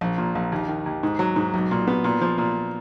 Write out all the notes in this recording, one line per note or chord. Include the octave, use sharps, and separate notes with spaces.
A#1
A#2
A#1
D#2
D#3
D#2
G#2
F#3
G#2
B1
A#2
B3
A#2
F3
A#2